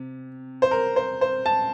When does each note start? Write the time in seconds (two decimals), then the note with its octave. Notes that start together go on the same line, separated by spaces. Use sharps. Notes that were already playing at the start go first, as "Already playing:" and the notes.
Already playing: C3
0.62 C5
0.71 A#4
0.96 C5
1.21 C5
1.46 A5